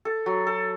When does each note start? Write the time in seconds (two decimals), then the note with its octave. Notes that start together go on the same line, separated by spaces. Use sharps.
0.05 A4
0.26 F#3
0.47 A4